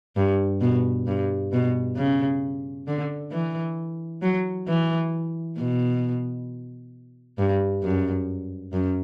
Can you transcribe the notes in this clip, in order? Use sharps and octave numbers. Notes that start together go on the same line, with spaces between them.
G2
B2
G2
B2
C#3
D3
E3
F#3
E3
B2
G2
F#2
F#2